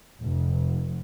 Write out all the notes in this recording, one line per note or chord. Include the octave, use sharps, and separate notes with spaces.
F1